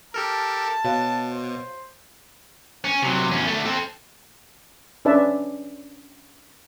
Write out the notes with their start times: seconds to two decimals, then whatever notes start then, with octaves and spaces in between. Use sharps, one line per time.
0.14 G4 A4 A#4 A5 F6
0.85 B2 F#4 C#5 F5
1.33 C5
2.85 C#4
3.03 C3 F#3
3.32 E2 C#4
3.47 D3 A3
3.65 C4 A4
5.05 C#4 D4 B4 D5 E5 A5